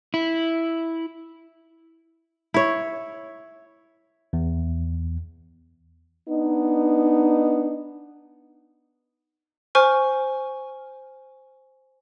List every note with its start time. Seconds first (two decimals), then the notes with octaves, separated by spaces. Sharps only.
0.14 E4
2.54 E4 C#5
4.33 E2
6.29 B3 D4 D#4
9.75 C5 G#5 C#6 F6